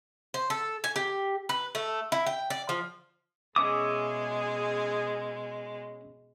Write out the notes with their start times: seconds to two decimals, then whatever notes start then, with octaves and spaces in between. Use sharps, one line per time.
0.34 C5
0.50 A4
0.84 G#5
0.96 G4
1.49 B4
1.75 A3
2.12 E4
2.26 G5
2.50 D5
2.69 F3
3.56 B2 G#3 C#4 G#4 E5 D6 D#6